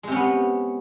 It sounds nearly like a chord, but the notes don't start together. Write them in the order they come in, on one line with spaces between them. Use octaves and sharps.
G#3 C3 C#4 B3